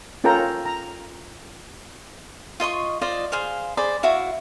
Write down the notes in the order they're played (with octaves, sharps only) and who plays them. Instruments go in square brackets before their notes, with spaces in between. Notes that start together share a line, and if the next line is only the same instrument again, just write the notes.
[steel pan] C#4 F4 A4 A#4 G5 A#5
A#5
[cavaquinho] F4 D#5 C6 C#6
F4 C5 D5 D#5
G#4 C5 F5
G#4 C5 D5 B5
E4 F#4 E5 F5